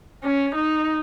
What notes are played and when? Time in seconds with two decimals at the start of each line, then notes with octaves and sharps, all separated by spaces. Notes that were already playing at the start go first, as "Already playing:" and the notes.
0.24 C#4
0.55 D#4